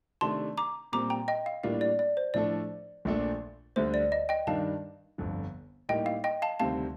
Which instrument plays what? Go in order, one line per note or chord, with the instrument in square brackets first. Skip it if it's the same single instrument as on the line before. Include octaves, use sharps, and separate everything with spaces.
[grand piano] C3 D#3 A3 D4 [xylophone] A5 C6
[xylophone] A#5 D6
[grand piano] A#2 G3 C4 [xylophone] A#5 D6
[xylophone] G5 A#5
D#5 G5
F5
[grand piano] A2 G3 A#3 D4 F4 [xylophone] F5
[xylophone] D5
D5
C5
[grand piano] A2 F3 A3 D4 A4 [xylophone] D5
[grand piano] A#1 A#2 A3 D4 A4
[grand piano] D2 D3 G3 [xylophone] C5
[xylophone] D5
D#5
D#5 G5
[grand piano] G2 D#3 G3 D4 [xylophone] F5 A5
[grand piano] G1 F2 D3
[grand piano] A2 G3 A#3 D#4 G4 [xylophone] D#5 G5
[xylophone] F5
D#5 G5
F5 A5
[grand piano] D2 C3 D#3 G3 C4 [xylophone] F5 A5